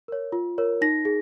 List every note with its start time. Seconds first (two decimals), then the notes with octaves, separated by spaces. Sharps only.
0.08 A#4 C#5
0.32 F4
0.58 A#4 C#5
0.81 D#4 A#6
1.05 G#4